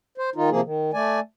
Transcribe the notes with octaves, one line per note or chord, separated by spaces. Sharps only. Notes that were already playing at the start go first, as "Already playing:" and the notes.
C5
D#3 D#4 F4
C3 F3 A#3 G#4
D#3
A3 D5 G#5